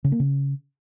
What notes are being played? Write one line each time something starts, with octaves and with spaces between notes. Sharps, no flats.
C#3
A#3
C#3